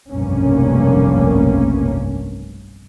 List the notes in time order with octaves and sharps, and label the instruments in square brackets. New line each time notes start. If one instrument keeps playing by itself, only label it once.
[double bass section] F1 B1 G2 A#3 C#4